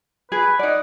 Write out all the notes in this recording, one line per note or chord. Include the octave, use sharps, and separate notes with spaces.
G#4 B4
D#4 D5 F#5